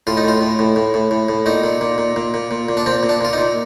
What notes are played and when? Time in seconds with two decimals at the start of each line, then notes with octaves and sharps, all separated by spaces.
0.07 A2 F4
0.17 D#4
0.24 A2 F4
0.41 A2
0.59 A2
0.76 A2
0.94 A2
1.11 A2
1.29 A2
1.46 A#2 D#4
1.64 A#2
1.81 A#2
1.98 A#2
2.16 A#2
2.34 A#2
2.51 A#2
2.69 A#2
2.77 D4
2.86 A#2 C4
3.03 A#2
3.09 D4
3.21 A#2 F4
3.33 D#4
3.38 A#2